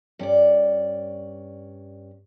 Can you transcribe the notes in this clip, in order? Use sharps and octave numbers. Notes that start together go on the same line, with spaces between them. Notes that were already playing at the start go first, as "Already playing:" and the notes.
G2 C#4 C#5 D5